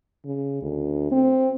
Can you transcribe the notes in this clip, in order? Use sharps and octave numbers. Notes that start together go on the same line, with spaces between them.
C#3
D2
C4